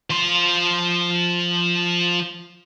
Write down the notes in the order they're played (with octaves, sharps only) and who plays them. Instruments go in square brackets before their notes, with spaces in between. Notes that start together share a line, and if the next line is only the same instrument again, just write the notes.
[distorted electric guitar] F3 C6